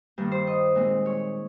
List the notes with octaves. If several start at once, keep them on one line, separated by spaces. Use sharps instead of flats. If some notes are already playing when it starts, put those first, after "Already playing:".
G2 D#3 A#3
C5
D#5
A#2 G#3 C4 D#4
C#5